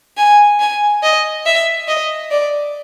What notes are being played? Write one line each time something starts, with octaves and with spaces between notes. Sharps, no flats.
G#5
G#5
D#5
E5
D#5
D5